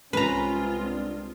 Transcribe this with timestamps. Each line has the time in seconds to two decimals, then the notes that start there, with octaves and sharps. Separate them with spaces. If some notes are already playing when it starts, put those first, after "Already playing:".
0.13 C2 G#3 C4 C#4 F4 B4 A#5
0.83 D4